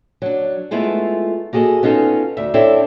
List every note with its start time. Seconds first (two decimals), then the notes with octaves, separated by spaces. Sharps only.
0.22 F#3 D4
0.71 G#3 A3 B3 E4 F4 G#4
1.53 A#3 F#4 G#4 A4 D#5
1.83 B3 C#4 D#4 F4 A4
2.37 D2 E5
2.54 C4 D4 E4 A4 C#5 E5